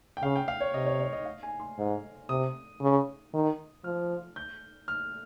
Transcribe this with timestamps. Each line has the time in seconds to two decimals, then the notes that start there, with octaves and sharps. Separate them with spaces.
0.17 G5
0.22 C#3 F5
0.36 G5
0.48 F5
0.61 C#5
0.74 C3 D#5
0.86 C#5
1.00 C#5
1.13 D#5
1.25 F5
1.43 G#5
1.60 C6
1.78 G#2
2.29 C3 D#6
2.81 C#3
3.33 D#3
3.84 F3 F6
4.36 G6
4.88 F6